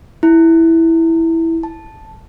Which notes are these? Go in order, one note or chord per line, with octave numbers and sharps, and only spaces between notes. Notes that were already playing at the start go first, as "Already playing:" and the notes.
E4
A5